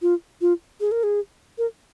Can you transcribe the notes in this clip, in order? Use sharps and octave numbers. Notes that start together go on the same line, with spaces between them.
F4
F4
G#4
A#4
G#4
A#4